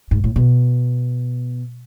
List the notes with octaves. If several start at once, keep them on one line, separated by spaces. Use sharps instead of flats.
G#2
A2
B2